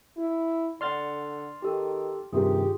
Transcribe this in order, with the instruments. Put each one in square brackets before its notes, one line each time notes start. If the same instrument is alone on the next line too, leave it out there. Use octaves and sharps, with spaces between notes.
[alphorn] E4
[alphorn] D3 [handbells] D5 F#5 [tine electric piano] C6 F6 A6
[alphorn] D#3 [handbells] G4 A4
[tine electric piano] G2 C3 D#3 [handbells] F4 G#4 [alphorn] G4